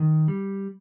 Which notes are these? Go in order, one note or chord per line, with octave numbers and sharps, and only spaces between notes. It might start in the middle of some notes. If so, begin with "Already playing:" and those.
Already playing: D#3
G3